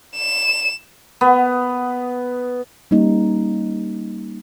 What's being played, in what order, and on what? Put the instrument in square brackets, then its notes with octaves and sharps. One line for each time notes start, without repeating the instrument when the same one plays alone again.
[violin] E7
[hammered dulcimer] B3
[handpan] G3 A#3 C#4 D#4